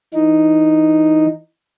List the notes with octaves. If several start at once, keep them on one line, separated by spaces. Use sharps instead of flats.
E3 D#4